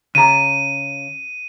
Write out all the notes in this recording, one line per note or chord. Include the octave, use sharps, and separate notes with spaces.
C#3 A#5 D#7